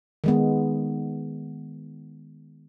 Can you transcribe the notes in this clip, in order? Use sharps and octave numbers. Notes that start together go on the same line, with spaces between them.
D#3 G#3 B3